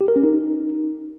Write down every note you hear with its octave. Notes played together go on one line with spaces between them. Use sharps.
G4
A#4
C#4
D#4